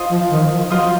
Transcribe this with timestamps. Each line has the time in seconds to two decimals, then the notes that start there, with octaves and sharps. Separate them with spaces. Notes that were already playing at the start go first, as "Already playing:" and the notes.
Already playing: F4 C5 D#5
0.09 F3
0.30 D#3
0.50 F3
0.70 F#3 F4 C5 D#5